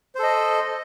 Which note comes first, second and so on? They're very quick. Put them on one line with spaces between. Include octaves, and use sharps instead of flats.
C5 A4 D#5